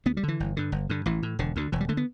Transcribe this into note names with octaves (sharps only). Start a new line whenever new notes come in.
D2 B3
G3
D3 E3
G1
G2 D3
G1
G2 D3
A1 E3
A2
E1 D3
D2 D3
E1 E3
G3
D3 A3
B3